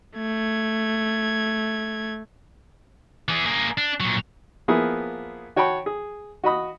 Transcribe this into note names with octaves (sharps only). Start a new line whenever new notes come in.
A3 G#6
E3 G#4
A#3 G#4
D4
A#2 F#3
F3 A#3 B3 E4 G#4
F#4 C#5 G5 A5 B5 C#6
G#4
F#4 D#5 B5 D#6